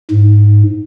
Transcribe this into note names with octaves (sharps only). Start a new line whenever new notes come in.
G#2